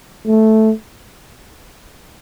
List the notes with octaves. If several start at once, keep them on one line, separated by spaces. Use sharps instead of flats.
A3